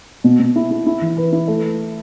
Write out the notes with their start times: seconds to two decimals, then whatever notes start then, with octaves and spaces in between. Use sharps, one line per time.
0.24 B2
0.39 B2
0.56 E4
0.71 E4
0.87 E4
1.02 E3
1.17 B4
1.33 E4
1.48 A3